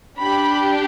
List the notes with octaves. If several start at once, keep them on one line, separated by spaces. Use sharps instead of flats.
D4 G4 B5